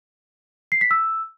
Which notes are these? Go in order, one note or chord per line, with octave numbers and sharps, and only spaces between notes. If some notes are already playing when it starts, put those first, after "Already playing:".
C7
B6
E6